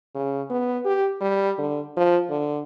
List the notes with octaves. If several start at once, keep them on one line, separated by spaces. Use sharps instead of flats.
C#3
B3
G4
G3
D3
F3
D3